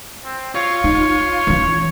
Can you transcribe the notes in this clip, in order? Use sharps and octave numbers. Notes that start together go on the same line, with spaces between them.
C4
F4 C#5
D#4
E3 C#4